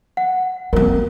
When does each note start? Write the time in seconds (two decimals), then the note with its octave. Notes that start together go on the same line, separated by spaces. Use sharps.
0.17 F#5
0.73 A#3 C4 A#4